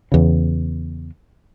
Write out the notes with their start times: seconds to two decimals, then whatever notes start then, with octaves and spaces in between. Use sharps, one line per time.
0.12 E2 C#3